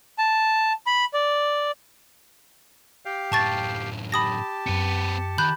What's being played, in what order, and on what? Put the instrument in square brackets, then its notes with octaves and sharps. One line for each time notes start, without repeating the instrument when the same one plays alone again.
[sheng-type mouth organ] A5
B5
D5
[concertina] G4 F5 G5
[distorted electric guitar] F#2 A2 [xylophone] A5 C#6 A6
[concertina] G4 A5 [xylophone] B5 D#6 A#6
[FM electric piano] F#2 C#7 [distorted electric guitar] C4 B4
[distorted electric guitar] D#3 [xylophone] B5 F#6 G6